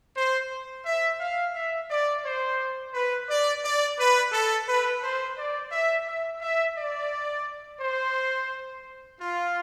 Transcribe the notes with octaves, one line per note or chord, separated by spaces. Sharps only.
C5
E5
F5
E5
D5
C5
B4
D5
D5
B4
A4
B4
C5
D5
E5
E5
E5
D5
C5
F4